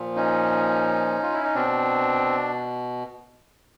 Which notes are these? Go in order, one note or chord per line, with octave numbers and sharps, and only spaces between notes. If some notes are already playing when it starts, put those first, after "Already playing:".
Already playing: A#2 F3
C#4 D#4
F4
E4
D#4
B2 C4 D4